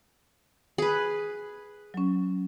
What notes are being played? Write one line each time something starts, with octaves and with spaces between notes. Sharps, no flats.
G#4 B4
F#3 C#4